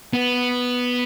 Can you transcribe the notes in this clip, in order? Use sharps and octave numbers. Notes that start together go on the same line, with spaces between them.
B3